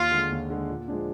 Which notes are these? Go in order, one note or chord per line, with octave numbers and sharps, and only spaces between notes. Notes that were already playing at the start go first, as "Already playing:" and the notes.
Already playing: D#2 F4
D3 G#3
D#2
D3 G#3
A#2
F3 G#3 D4